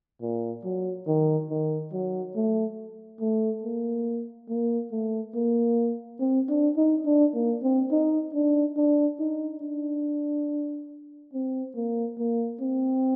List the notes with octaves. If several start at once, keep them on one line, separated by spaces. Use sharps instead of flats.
A#2
F#3
D#3
D#3
F#3
A3
A3
A#3
A#3
A3
A#3
C4
D4
D#4
D4
A#3
C4
D#4
D4
D4
D#4
D4
C4
A#3
A#3
C4